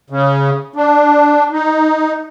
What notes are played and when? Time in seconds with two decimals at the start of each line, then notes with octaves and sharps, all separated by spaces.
0.10 C#3
0.76 D4
1.52 D#4